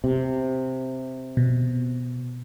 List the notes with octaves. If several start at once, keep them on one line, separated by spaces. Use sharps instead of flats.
C3
B2